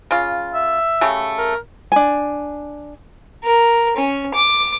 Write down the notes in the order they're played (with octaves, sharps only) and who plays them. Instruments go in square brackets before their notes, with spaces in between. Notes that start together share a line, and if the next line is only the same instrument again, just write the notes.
[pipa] C#3 F4
[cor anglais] E5
[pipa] C#3 A3 G4
[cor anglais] A#4
[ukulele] D4 G#5
[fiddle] A#4
C#4
D6